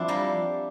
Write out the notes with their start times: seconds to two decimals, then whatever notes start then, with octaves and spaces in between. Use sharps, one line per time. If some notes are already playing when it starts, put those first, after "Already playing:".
Already playing: F3 C4 D4 E4
0.08 G3 A#3